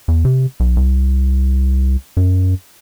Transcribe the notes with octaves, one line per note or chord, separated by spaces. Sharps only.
E2
C3
B1
C2
F#2